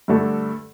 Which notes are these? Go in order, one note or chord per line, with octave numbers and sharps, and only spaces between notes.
G2 D3 A3 D4 A4